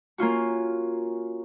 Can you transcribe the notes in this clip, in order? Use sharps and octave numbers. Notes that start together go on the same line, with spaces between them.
A#3 C#4 F4 F#4